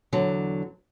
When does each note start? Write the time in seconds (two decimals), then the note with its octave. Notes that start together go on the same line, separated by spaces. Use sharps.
0.12 E2 D3 F#3